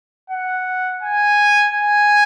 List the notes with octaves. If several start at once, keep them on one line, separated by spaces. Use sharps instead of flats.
F#5
G#5
G#5